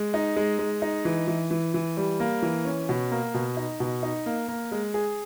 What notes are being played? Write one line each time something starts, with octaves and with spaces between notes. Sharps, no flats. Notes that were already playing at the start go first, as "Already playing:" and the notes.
Already playing: G#3
D#4
G#3
G#3
D#4
E3
E3
E3
E3
G3
A#3
E3
C#4
B2
A#3
B2
D#4
B2
D#4
A#3
A#3
G#3
G#4